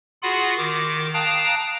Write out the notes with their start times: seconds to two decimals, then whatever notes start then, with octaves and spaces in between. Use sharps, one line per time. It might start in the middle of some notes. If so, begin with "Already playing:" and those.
0.23 F4 F#4 G#4 F#5 B5
0.58 D#3 D6
1.14 F5 G5 A5 A#5 D#6 F#6